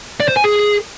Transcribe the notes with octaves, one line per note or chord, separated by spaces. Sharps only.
D5
C5
G#5
G#4